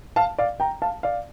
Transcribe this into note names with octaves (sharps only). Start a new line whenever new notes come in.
F5 A5
D5 F5
G5 A#5
F5 A5
D5 F5